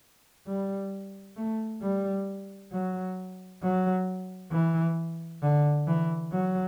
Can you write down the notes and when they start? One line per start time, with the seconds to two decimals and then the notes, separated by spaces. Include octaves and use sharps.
0.47 G3
1.37 A3
1.82 G3
2.72 F#3
3.62 F#3
4.52 E3
5.42 D3
5.87 E3
6.32 F#3